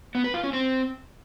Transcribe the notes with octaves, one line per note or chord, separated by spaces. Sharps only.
B3
B4
F4
C#4
C4